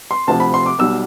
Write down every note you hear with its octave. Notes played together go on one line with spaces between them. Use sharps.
C6
D2 C3 F3 A5
B5
C6
D6
B1 B2 G3 E6